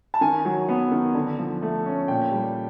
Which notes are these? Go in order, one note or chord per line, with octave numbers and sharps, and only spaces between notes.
A5
D#3 G#5
F#3
B3
D#3
D3
F3
A3
C#4
A#2 G5
G3